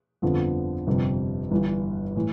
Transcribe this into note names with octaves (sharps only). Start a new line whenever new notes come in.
G1 F2 D3 F3 B3
G1 F2 C3 G3
G1 G2 E3 G3
A2 E3